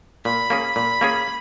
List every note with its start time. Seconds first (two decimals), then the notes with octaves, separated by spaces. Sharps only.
0.25 A#2 B5
0.50 A#3 C#4 G#4
0.76 A#2 B5
1.01 A#3 C#4 G#4